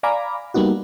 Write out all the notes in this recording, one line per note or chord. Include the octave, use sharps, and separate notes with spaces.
D5 F5 G#5 A#5 B5 D6
G3 A#3 B3 D#4 F#4